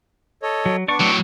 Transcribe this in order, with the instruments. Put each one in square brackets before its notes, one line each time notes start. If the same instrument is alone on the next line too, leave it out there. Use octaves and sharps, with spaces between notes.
[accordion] A4 C#5 D#5
[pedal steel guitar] F#3
[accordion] B3 D4 [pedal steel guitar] D5 C#6
[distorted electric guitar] A2 F#3 [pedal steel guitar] G5 C#6